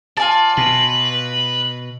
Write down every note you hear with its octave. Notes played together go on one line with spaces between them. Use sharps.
F4 D5 G#5 A5
B2 B4